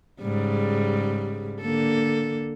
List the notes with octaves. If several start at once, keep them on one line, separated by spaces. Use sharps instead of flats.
G#2 C#3 G3
D3 A#3 A4